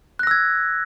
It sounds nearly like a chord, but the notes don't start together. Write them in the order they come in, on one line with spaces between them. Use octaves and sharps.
F#6 A#6 E6 G#6